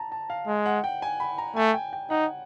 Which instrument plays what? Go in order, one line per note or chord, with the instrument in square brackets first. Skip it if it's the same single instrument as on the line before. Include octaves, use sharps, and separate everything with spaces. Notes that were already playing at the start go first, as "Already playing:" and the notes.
Already playing: [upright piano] A5 A#5
A5
F5
[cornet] G#3
[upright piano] F#5
G5
G#5
B5
A#5
[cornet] A3 [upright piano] G#5
[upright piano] G5
G5
[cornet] D#4 [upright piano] F#5